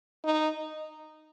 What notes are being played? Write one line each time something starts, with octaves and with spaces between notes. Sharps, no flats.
D#4